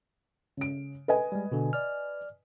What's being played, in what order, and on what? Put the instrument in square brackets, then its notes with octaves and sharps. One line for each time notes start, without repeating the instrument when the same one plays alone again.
[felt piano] C#3 D7
B4 D#5 G#5
[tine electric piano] G3 G#3
B2 D3
D5 F6